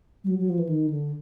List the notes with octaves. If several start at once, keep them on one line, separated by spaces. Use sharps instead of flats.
G3
F#3
F#3
F3
E3
D#3
D3